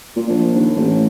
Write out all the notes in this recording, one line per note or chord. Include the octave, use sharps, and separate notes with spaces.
A#2
A#1
D#2
A1